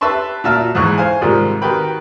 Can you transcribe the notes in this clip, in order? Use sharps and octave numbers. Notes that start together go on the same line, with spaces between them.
G4 B4 E5 A5 C6 C#6
A#2 F4 F#4 E5 A5 F6
E2 G#2 E3 C#6 F#6
C5 F5 G#5
G#2 C3 D#3 F3 G3
D#3 F#4 G4 B4 G5 B5